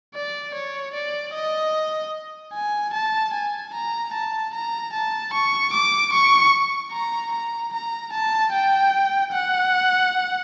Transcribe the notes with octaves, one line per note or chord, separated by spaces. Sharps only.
D5
C#5
D5
D#5
G#5
A5
G#5
A#5
A5
A#5
A5
C#6
D6
C#6
A#5
A#5
A#5
A5
G5
F#5